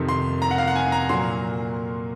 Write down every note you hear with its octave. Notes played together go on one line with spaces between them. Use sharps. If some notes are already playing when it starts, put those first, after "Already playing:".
Already playing: F2 C3 D#3
C6
A#5
F#5
F5
F#5
G#5
A#5
A#2 F#3 A#3 C6